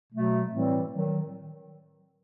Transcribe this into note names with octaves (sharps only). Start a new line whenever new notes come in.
B2 F#3 A3
A2 E3 G3 C4
D#3 F#3